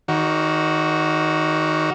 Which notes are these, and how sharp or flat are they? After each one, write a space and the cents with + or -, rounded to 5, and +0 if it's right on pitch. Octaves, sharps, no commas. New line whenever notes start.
D#3 +10 F#4 +0 D5 -45